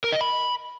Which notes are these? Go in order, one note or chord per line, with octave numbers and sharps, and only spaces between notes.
A#4
D#5
B5